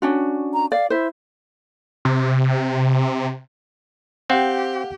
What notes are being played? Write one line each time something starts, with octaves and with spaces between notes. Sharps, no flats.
C#4 D4 F#4
A#5
D5 F5
E4 C5 E5
C3
C4 G4 F5 F#5